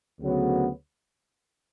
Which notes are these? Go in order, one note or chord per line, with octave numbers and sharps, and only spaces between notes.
D2 C#3 F#3 B3